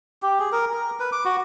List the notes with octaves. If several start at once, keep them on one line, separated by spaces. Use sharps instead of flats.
G4
G#4
A#4
A#4
B4
D6
F#4